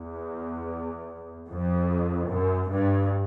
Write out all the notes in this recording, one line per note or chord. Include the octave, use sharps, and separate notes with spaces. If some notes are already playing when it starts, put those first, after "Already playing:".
Already playing: E2
F2
F#2
G2